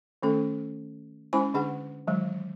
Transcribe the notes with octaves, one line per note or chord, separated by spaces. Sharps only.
D#3 A3 C#4 A4
G#3 C#4 E4 C5 G#5 B5
D3 D4 G#4 F#5
D#3 E3 F#3 G#3